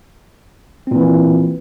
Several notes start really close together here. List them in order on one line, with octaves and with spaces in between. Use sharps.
C4 A#2 E3